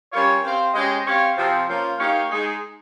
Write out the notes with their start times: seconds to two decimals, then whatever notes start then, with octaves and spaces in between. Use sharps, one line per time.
0.12 G3 C#4 F4 A#4 C#5
0.42 C4 G4 C5 F5
0.73 G#3 C#4 G4 C5 D#5
1.05 C4 G4 C#5 F5
1.36 C3 F3 C4
1.67 F3 A#3 C#4 F4
1.97 A#3 D#4 G4 C#5 F5
2.28 G#3 D#4 G#4